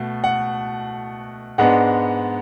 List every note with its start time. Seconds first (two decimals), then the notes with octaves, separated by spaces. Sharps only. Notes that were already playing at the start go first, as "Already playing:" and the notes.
Already playing: B2 A3
0.24 F#5
1.58 G#2 G#3 B3 D4 F#5